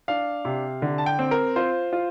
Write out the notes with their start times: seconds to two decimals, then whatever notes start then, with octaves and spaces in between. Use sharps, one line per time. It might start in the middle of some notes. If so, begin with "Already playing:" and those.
0.08 D4 F5
0.45 C3
0.82 D3
0.98 A5
1.06 G5
1.19 C4
1.31 A#4
1.56 F4 C5
1.93 F4